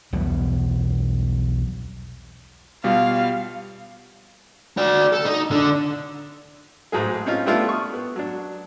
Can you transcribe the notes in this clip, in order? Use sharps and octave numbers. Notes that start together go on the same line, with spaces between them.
B1 E2 B2 G3
B2 G3 F4 F5
F#4 D5
A4
D#4
D3
A1 G#2 F#3 G#4
C4 C#4 D#4 F4
G3 A3 B3 D4 E4 F4
C#6 D#6
B3
F#3 D4